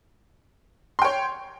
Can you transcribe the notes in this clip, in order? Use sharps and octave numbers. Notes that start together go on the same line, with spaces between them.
C#5 G5 C6